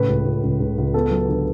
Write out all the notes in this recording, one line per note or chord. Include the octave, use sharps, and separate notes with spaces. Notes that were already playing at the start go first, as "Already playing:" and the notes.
Already playing: A2 C#3 B4
C#2
C#2
C#2
C#2
C#2
B3 A4
F#3
D3